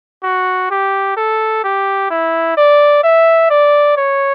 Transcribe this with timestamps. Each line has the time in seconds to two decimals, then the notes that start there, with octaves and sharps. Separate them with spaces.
0.24 F#4
0.71 G4
1.17 A4
1.64 G4
2.11 E4
2.57 D5
3.04 E5
3.50 D5
3.97 C#5